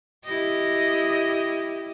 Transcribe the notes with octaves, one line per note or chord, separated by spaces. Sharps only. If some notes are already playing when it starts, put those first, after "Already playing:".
E4 G4 D#5